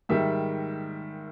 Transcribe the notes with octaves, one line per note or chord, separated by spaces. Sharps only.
G#2 D#3 G3 E5